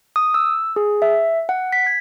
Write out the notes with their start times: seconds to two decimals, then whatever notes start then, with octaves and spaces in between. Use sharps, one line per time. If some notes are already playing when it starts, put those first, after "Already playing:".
0.16 D#6
0.34 E6
0.76 G#4
1.02 E5
1.49 F#5
1.73 B6
1.87 G#6